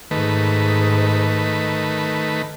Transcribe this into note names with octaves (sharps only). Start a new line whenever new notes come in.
G#2 D#3 A3 B4